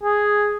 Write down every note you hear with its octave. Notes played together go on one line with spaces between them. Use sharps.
G#4